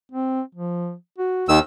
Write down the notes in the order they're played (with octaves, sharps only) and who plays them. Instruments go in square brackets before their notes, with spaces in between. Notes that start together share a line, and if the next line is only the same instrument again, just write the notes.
[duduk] C4
F3
F#4
[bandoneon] D#2 D#3 E6